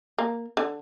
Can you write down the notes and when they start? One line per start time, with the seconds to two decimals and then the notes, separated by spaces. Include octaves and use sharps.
0.18 A#3
0.57 D3